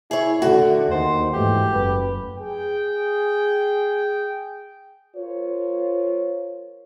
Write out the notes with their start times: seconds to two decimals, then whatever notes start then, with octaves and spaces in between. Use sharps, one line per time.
0.11 E4 G#4 C#5
0.42 D3 A3 F#4
0.91 D#2 D#3 C5
1.33 G#2 E3 A3 G4
1.72 F#1 B4
2.38 G#4 G5
5.16 F4 A#4 C5 C#5